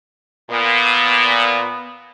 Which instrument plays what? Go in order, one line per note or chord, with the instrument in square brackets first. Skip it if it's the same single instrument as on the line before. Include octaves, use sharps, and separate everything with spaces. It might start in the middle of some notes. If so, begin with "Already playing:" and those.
[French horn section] A#2 [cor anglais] B3